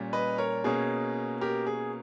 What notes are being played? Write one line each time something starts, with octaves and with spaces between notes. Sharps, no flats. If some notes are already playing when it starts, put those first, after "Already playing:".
Already playing: A#2 G3 C#4
B4 D#5
A#4 C#5
B2 A#3 C#4 G#4
G4 A#4
G#4